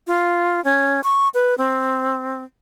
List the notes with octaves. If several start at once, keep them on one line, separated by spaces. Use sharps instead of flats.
F4
C#4
C#6
B4
C4